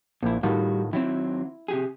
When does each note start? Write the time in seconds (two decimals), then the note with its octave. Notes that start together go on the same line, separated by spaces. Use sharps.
0.23 A#1 A#2 E4
0.43 A2 D#3 G3 F4 F#4
0.93 D#3 F#3 C4 E4
1.68 C3 G4 G#4